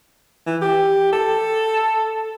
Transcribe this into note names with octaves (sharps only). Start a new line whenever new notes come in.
E3
G4
A4